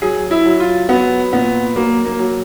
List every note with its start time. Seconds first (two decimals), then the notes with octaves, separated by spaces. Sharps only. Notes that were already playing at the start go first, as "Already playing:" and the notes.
0.02 F#3 G#4
0.31 E4
0.46 F#3
0.60 F4
0.89 F#3 B3
1.33 A#2 B3
1.76 F#3 A#3
2.05 A#3
2.19 F#3